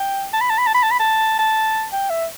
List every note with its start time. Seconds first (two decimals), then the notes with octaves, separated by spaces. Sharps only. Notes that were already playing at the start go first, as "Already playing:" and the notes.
Already playing: G5
0.33 A5
0.41 B5
0.50 A5
0.58 B5
0.67 A5
0.75 B5
0.83 A5
0.91 B5
1.00 A5
1.39 A5
1.92 G5
2.10 E5